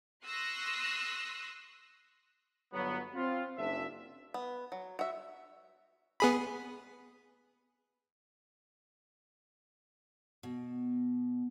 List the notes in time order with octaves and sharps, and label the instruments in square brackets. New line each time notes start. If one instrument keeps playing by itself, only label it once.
[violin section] C6 C#6 D#6 E6 F#6 A#6
[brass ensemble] G1 F#3 B3
C4 F4
F#1 D4 E5
[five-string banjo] B3
F#3
F#4 E5
[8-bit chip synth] B3 G#4 B5
[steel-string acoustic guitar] B2